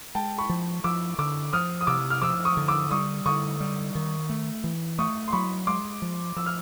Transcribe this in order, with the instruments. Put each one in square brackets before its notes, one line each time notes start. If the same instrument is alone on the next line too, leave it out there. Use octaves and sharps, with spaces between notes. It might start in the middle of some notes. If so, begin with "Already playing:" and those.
[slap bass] G#3 [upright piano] G5 A5
[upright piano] B5 C#6
[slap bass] F3
[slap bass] F3 [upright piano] D6 E6
[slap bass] D3 [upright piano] D6 E6
[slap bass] F3 [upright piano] D#6 F6
[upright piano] D#6
[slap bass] C3 [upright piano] D6 E6
[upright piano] F6
[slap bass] F3 [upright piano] D6 E6
[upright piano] C#6 D#6
[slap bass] D3
[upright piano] D6 E6
[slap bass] G3 [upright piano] C#6 D#6
[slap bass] D3 [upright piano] C#6 D#6
[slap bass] G3
D#3
A3
E3
[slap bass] A3 [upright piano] C#6 D#6
[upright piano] C6
[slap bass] F#3 [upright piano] B5 C#6
[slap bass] G#3 [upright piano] C6 D6
[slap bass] F3
[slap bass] F3 [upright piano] E6
[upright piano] F6